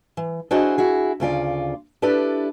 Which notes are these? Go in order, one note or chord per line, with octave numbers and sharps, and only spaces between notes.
E3
D4 E4 F#4 G#4 C5 D#5
E4 F#4 G#4
D2 C#3 F4 D5
D4 E4 G4 A4 B4 D5